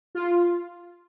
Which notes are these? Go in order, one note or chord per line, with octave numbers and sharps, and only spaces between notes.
F4